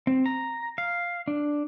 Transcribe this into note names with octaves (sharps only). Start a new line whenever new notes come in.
C4
A#5
F5
D4